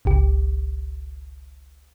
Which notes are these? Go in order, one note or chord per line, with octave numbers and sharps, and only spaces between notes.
G1 C#2 G4